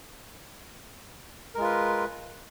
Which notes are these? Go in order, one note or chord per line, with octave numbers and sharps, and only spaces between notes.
G#3 F4 A#4 B4